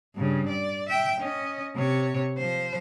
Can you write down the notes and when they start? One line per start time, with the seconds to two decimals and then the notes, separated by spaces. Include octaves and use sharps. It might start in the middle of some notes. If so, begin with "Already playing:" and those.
0.16 G2 C#3
0.49 D5
0.89 E5 G5
1.20 C#4 D#5
1.75 C3 C#5
2.38 F3 C5